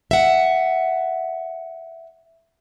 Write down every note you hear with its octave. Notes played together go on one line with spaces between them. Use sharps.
E5 F#5